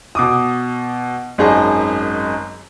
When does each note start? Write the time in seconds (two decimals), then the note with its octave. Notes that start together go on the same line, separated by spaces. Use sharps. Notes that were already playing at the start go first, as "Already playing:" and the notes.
0.15 B2 D6 D#6
1.38 G#1 F#2 D#4 G#4 D#5 A5